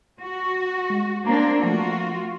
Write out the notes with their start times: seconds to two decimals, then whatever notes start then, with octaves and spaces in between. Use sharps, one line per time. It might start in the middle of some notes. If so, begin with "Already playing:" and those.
0.21 F#4
0.90 G#3
1.27 A#3 C4 D4 A#5
1.63 F3 A3 F4 F#4